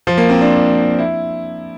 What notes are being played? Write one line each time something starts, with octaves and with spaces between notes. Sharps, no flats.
F3
A#3
C4
D4
E4